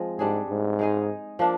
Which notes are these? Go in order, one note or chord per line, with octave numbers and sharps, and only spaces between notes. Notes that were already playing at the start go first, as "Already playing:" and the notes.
Already playing: F3 G#3 C4
G#2 G3 D4 G#4
G#2
G#3 D#4 G#4
F3 A#3 D4 F4